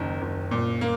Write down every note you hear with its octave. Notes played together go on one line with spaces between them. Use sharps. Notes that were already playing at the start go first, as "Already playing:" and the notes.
Already playing: F#1 D#2 D#3 A#5
F#1
A#2
A#3